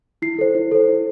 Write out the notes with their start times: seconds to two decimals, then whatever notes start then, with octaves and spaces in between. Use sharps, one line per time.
0.22 E4 C7
0.39 A4 C5
0.55 E4
0.71 A4 C5
0.88 E4